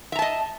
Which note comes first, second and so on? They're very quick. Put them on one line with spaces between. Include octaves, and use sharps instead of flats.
E5 A#5 A5 D#5